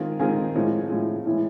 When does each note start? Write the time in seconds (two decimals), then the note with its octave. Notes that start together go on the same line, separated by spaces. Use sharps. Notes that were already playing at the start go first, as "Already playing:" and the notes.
Already playing: D#3 G#3 C4 F4 G#4
0.19 D#3 G#3 C4 F4 G#4
0.55 A2 F3 G#3
0.90 A2 F3 G#3
1.26 A2 E3 G#3